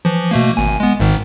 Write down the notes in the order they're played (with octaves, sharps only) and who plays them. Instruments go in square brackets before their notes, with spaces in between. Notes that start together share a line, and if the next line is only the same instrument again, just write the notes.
[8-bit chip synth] E3 F3
B2 A3 A#3
G#1 G#5
G#3 B3
G#1 G#2 D#3